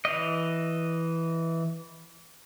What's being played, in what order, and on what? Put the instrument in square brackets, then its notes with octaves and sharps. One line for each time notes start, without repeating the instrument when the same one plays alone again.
[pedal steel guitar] E3 D#5